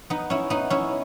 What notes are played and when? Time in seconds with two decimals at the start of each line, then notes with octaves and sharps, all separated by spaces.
0.10 B3 D#4
0.30 C#4 E4
0.50 B3 D#4
0.70 C#4 E4